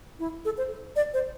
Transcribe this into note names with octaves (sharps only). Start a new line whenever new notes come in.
E4
A4
C5
D5
C5